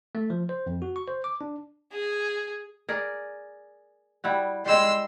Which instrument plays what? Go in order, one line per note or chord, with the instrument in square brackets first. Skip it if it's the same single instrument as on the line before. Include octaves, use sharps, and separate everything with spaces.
[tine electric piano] A3
F3
C5
F2
F#4
C#6
C5
D6
D4
[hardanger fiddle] G#4
[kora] G#4 A#4 D5
G3 E4 F#4
[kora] G3 G#3 [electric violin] C6 E6